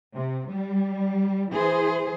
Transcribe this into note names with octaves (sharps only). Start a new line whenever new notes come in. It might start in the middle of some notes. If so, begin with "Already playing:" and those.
C3
G3
E3 G#4 C5